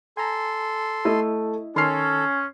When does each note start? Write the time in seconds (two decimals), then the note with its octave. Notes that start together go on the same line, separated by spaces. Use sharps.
0.17 A4 G#5 A#5 C6
1.05 A3 E4 D#5
1.76 D#3 C#4 A4 C6 F6 C7